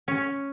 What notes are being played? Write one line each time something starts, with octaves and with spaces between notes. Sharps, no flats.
C#4